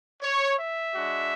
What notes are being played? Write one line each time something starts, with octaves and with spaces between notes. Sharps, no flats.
C#5
E5
G#3 D4 F#4